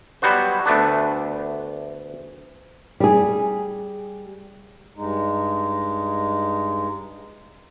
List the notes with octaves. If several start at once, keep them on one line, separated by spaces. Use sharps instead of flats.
F#3 G3 B3 F#4 C5
D2 A3 B3 D4
G3 G#4
G2 G#3 D#4